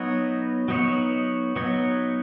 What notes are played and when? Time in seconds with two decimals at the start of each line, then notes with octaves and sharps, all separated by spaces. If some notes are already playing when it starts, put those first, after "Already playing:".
Already playing: F#3 B3 D#4 F#4 C#5
0.68 F#3 B3 D#4 F#4 C#5
1.56 F#3 B3 D#4 F#4 C#5